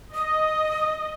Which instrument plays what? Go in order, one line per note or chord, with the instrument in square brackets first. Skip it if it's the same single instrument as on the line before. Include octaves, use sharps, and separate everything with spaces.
[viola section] D#5 [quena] D#6